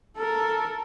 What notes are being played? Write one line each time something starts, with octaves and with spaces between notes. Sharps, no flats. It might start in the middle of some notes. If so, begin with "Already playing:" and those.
A4 A#4